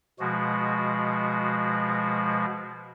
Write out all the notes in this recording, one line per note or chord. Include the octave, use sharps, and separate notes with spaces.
B2 F3 G#3 F#4